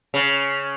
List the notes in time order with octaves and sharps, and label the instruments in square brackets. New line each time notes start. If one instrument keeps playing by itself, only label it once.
[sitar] C#3